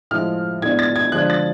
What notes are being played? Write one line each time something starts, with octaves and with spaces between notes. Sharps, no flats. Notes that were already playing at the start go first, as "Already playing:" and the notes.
A2 F3 G#3 F6
A2 G#3 B3 D4 G#6
A6
G#6
D3 F3 G#3 D4 F#6
A6